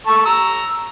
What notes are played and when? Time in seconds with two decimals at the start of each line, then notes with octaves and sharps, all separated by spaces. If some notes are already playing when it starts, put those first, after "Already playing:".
0.07 A4 A5 C#6
0.25 A#5 E6